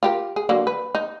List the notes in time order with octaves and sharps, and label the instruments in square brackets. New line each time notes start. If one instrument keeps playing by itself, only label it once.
[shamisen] F4 G4 A#4
G#4
D3 F#3 A#3
B4
D#4